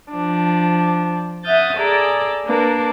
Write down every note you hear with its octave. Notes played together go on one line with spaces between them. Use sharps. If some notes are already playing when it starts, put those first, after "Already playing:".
F3 D4
E5 F#5 D#6 F6 G6 A6
G#4 A4 D5 A#5 D6
A#3 D4 A#4 B4